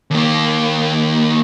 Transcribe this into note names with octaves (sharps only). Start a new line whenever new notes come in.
D#2 A#3